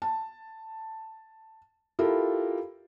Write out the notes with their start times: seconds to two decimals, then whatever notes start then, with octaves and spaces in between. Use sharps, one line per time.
0.02 A5
1.99 E4 F4 G4 A4 A#4